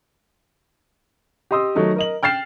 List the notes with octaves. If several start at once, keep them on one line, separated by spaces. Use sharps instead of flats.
G4 D#5 C6 D#6 E6
D#3 F#3 A3 D#4 D#5
A#4 D#5 F#7
G5 F6 A6 C7 E7